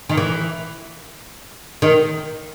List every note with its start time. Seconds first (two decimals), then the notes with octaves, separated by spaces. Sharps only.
0.09 D#3
0.17 E3
1.82 D#3